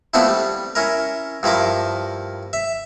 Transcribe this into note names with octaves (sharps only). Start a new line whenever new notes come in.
F3 A3 B3 C4 D4 E4
G3
C#4 E4 A#4
G2 F3 E4 A#4 D6
E5